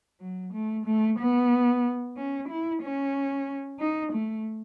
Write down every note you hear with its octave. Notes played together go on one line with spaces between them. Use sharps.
F#3
A3
A3
B3
C#4
E4
C#4
D#4
A3